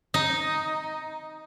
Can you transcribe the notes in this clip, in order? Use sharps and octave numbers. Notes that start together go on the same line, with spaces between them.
D#4